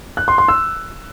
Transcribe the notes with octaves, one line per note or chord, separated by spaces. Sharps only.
F#6
C6
C6
E6